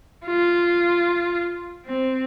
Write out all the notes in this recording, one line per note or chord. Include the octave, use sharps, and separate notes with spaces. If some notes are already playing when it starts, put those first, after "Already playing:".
F4
C4